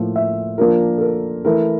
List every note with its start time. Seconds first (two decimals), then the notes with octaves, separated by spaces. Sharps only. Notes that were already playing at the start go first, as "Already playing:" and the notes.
Already playing: A2 F3 A#3
0.16 E5
0.58 F3 A#3 D4 F4 A#4
0.98 A4
1.01 A#4
1.45 E3 A3 E4 A#4